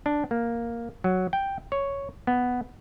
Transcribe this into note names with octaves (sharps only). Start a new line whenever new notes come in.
D4
A#3
F#3
G5
C#5
B3